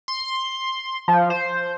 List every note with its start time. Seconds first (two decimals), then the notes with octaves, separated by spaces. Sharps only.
0.08 C6
1.08 F3
1.30 C5